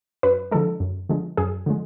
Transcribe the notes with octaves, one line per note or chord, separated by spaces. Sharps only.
F#2 B4
D3 F3 G#3 A4
F#2
D3 F3 G#3
F#2 G#4
D3 F3 G#3